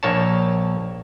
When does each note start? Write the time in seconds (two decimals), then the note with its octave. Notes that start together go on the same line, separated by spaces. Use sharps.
0.03 A#1 A#3 C#5 A5